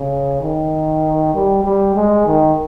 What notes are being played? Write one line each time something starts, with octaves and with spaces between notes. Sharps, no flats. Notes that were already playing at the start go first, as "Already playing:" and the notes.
Already playing: C#3
D#3
G3
G3
G#3
D#3